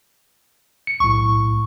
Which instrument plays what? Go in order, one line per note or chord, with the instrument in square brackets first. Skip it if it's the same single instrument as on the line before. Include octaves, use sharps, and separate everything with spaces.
[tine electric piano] C#7
[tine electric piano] B1 A2 [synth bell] C#6